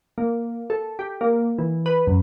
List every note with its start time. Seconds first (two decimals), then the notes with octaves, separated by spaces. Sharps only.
0.18 A#3
0.70 A4
0.99 G4
1.21 A#3
1.58 E3
1.86 B4
2.07 F#2